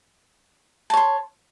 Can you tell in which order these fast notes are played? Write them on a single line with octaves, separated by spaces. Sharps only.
A5 C#5 C6